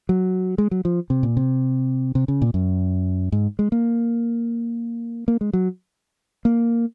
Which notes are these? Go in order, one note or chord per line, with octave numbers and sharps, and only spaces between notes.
F#3
G#3
F#3
F3
C3
A#2
C3
C3
C#3
A#2
F#2
G#2
G#3
A#3
A#3
G#3
F#3
A#3